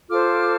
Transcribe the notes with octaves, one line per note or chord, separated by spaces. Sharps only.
F4 A4 C5 D6 F6